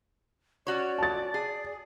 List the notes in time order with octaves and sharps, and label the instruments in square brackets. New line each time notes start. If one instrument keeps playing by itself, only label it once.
[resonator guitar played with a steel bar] C#4 F#4 C#5 [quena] D5
[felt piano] A5 A6
[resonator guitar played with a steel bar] G#4